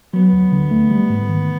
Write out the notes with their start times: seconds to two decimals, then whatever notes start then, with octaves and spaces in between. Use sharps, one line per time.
0.13 F#3 B3
0.33 D2
0.52 D3
0.71 A3
0.91 G3
1.10 G#2
1.29 D#3